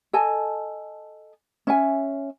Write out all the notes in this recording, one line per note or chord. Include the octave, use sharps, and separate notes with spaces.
A4 D#5 G#5 A5
C#4 E5 G#5